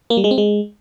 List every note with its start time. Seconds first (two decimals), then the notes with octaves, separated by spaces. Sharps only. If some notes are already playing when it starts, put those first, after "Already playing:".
0.10 A#3
0.17 G3
0.24 G#3
0.31 C4
0.38 G#3